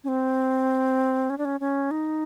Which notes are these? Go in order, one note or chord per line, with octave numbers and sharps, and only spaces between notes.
C#4
C4
C#4
D4
C#4
C#4
D#4